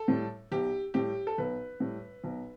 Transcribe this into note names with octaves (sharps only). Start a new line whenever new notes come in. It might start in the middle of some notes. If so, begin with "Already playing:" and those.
Already playing: A4
A2 G3
B1 G4
A2 G3 G4
A4
B1 B4
A2 G3
B1